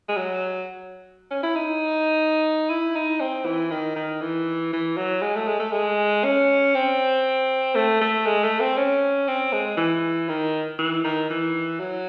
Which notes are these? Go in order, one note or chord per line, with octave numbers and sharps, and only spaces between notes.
G#3
F#3
C#4
E4
D#4
E4
D#4
C4
E3
D#3
D#3
E3
E3
F#3
G#3
A3
G#3
A3
G#3
C#4
C4
A3
A3
G#3
A3
C4
C#4
C4
G#3
E3
D#3
E3
D#3
E3
F#3